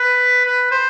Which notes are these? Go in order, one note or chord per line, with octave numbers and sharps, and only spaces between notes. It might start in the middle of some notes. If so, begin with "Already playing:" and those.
Already playing: B4
B4
C5